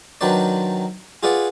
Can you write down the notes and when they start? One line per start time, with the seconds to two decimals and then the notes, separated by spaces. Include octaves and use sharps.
0.21 D#3 F#3 D4 B4 C5 D5
1.23 F4 G#4 B4 D5 F#5